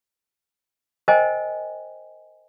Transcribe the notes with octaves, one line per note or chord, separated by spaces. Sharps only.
A#4 C5 D#5 G5 G#5